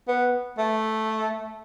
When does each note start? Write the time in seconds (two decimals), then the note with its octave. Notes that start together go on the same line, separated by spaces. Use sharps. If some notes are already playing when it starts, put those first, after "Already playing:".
0.08 B3
0.58 A3